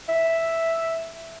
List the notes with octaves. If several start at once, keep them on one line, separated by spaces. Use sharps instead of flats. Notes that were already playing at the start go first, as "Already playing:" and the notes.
E5